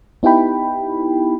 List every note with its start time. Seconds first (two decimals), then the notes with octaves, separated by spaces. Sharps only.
0.23 B3 D#4 E4 G4 G5 B5